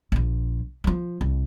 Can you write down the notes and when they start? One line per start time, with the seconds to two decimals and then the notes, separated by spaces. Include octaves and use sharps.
0.12 A#1 F3
0.84 E3 F3
1.21 C2